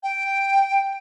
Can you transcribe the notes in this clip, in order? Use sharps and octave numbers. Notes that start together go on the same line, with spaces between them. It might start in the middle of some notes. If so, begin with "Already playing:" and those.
G5